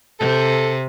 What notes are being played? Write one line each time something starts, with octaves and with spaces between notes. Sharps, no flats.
C3 A4